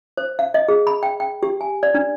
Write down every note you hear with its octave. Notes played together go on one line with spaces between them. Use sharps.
C5
F5
D#5
G#4
B5
G5
G5
G4
G#5
D5
D4